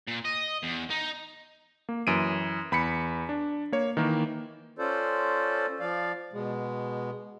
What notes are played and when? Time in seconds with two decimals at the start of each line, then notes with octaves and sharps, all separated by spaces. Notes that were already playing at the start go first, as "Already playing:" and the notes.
0.08 A#2
0.25 D#5
0.63 E2
0.90 D#4
1.89 A#3
2.07 F#2 E3 D7 D#7
2.72 E2 B5 B6 C#7
3.29 D4
3.72 A#3 C#5
3.97 D#3 E3 A#3
4.79 C#4 F4 A4 C5 D5
5.80 F3 D5 F5
6.33 B2 G#3